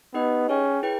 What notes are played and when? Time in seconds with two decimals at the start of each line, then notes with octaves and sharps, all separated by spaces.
0.14 B3 D#4 G4 B4 D#5
0.49 C#4 G#4 C#5 G5
0.83 E4 G#4 B4 G5